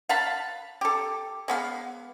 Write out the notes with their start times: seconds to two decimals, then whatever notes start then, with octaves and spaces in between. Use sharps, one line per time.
0.09 F5 F#5 A5 B5
0.81 G4 A4
1.48 G#3 B3 F5